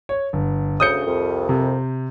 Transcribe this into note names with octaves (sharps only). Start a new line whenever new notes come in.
C#5
G1
D2 C#3 D#6 G6 C#7
C2 F2
C3